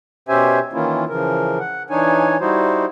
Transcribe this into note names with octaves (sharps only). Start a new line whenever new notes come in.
B2 C#4 G4 C5 E5 G#5
D#3 E3 A#3 C#4 E4 F4
C#3 E3 F3 A#4
F#5
E3 D4 D#4 C#5 G#5
G3 D#4 E4 F#4 C5